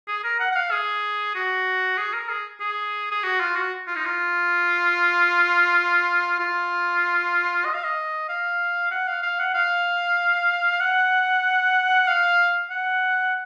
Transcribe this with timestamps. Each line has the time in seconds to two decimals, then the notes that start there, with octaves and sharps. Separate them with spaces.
0.08 G#4
0.23 A#4
0.40 F#5
0.51 F#5
0.55 F5
0.71 G#4
1.35 F#4
1.97 G#4
2.13 A#4
2.29 G#4
2.60 G#4
3.11 G#4
3.23 F#4
3.40 F4
3.56 F#4
3.87 F4
3.96 D#4
4.06 F4
6.39 F4
7.65 D#5
7.74 F5
7.84 D#5
8.29 F5
8.91 F#5
9.07 F5
9.23 F5
9.39 F#5
9.54 F5
10.80 F#5
12.07 F5
12.70 F#5